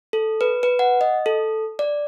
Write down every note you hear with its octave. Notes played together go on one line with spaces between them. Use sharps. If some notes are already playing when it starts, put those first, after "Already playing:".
A4
B4
B4
F#5
D#5
A4
D5